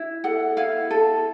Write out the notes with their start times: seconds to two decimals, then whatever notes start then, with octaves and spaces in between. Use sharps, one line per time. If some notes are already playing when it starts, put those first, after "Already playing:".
Already playing: E4
0.24 A4 F#5
0.57 E4 F5
0.91 A4